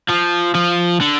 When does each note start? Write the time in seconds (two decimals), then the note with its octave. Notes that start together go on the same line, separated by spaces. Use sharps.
0.09 F3
0.55 F3
1.01 D3